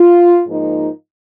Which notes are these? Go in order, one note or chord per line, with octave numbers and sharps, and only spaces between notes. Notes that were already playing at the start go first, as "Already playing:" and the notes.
Already playing: F4
G#2 F3 A#3 D#4